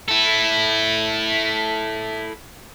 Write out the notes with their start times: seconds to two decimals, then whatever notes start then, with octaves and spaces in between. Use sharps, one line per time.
0.08 E4 A4